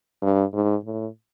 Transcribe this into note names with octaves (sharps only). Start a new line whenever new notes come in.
G2
G#2
A2